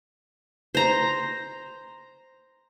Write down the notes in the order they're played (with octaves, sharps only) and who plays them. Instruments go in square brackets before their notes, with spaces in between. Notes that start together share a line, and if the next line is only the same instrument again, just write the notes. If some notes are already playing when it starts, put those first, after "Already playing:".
[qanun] C5 A#5